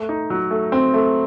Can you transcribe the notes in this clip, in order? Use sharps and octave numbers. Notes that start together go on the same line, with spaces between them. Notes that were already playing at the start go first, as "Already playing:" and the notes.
Already playing: A3
D#4
F#3
A3
C4
A3